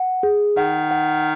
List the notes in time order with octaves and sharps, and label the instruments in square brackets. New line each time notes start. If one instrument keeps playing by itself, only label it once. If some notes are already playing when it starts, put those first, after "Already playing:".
Already playing: [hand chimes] F#5
G#4
[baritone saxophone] D#3 [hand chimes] F#5
[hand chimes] F#5